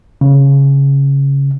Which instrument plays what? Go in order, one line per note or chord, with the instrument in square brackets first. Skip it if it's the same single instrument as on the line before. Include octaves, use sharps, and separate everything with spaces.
[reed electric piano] C#3